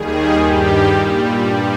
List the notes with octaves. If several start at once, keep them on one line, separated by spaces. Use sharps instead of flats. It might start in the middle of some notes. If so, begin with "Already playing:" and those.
Already playing: D#2 D#3 G3 G#4
G2 D#3 G3 G4
A#2 G3
G2 G3